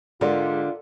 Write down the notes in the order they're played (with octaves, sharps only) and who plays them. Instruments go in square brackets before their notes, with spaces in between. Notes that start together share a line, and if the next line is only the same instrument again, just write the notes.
[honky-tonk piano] G#2 G#3 [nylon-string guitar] D3 [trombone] F4 [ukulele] A#4 D5